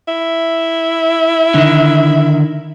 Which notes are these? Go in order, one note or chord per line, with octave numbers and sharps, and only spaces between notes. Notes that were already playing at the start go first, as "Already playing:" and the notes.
E4
D3 D#3